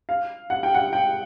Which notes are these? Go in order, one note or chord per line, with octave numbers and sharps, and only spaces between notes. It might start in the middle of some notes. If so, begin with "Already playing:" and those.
F5
F#5
G5
F#5
G5